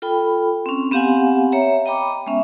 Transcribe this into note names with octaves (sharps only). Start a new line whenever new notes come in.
F4 A4 G5 B5
C4 C#4
B3 C4 G4 F5 F#5 G#5
C#5 E5 A#5
D#5 G5 A#5 B5 D6
G#3 B3 C#4 E5